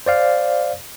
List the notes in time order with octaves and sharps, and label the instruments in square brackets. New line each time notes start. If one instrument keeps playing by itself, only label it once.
[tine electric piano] C5 D5 F5